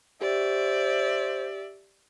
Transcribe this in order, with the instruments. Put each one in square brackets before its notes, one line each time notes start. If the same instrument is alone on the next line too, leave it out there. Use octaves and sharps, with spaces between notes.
[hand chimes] G4 [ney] C5 [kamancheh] D5 E5